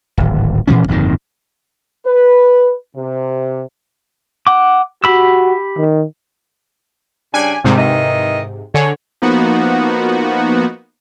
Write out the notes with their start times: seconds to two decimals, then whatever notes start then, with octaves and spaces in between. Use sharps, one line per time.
0.17 D1 G#1
0.67 A#2 E3 F3 C#4
0.88 G1 F2 A#2 D#3
2.05 B4
2.95 C3
4.47 F#5 D6
5.04 F#4 G4 B5 E6
5.78 D#3
7.34 C#3 G3 D4 G#5
7.64 G#2 C3 D#3 G3
7.78 D#3 E3 D#5
8.74 D3 G#4 C#5
9.22 F3 A#3 B3 D#4 F#4